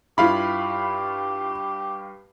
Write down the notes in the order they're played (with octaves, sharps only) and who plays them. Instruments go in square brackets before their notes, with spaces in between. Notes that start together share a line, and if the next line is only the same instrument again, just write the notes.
[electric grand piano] G2 F5 B5 [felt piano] E4 F4 [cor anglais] G4